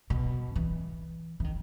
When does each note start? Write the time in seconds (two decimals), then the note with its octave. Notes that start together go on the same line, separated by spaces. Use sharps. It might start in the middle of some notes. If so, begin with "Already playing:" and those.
0.10 B2
0.55 E3
1.40 E3
1.44 D#3